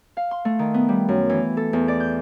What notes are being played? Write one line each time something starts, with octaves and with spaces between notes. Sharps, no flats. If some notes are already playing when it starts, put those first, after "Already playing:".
F5
C6
A3
D#3
B3
G3
F#2
E3
A4
E2
D5
G6